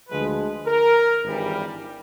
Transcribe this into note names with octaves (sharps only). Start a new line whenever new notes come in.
D2 D3 F3 G#3 B4
A#4
G#1 G2 E3 G3